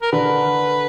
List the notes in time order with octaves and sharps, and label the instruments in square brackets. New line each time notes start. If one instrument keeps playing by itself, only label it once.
[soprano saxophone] A#4
[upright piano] D3 [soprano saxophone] B4